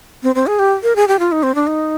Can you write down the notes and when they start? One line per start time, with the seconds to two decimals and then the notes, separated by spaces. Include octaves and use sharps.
0.23 C4
0.35 C4
0.47 G#4
0.59 G4
0.83 A#4
0.96 G#4
1.08 G4
1.19 F4
1.32 D#4
1.43 C4
1.55 D4
1.67 D#4